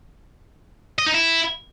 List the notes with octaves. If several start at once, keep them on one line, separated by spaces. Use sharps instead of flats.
D#5
D#4
E4